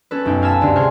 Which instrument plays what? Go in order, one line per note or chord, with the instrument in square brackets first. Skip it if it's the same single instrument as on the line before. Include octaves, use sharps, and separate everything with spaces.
[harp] C#4 A4 B4
B1 F#2 D#4 G5
F5 G#5 A5 B5 E6
D2 G2 C3
G#4 C5 F5 G#5 C#6